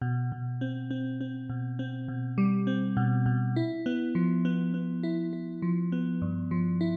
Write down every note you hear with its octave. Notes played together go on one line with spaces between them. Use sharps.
B2
B2
C4
C4
C4
B2
C4
B2
G3
C4
B2
B2
E4
B3
F3
B3
B3
E4
E4
F3
B3
G2
F3
E4